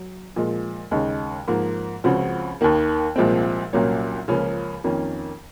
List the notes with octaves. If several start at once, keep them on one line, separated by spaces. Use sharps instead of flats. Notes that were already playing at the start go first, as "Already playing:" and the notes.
Already playing: F#3
A#2 F3 G#3
D#2 C#3 G#3 D#4
G#2 F3 A#3
C#2 C#3 F3 C4 F#4
D#2 D#3 A#3
C2 A#2 F3 G#3 C4
C2 A#2 F#3 A#3 C#4
C#2 C#3 F3 A#3 C#4
F2 D#3 A#3 C#4